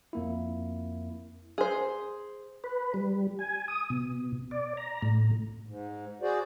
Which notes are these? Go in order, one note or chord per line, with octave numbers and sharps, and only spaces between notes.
F2 A#3 E4
G#4 C5
B4
G3
G#5
D#6
B2
D5
A#5
A2
G#2
F#4 G#4 C5 D5